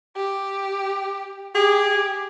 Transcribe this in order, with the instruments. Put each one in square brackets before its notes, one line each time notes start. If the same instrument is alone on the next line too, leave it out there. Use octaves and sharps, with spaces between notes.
[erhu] G4
[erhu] G4 [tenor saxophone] G#4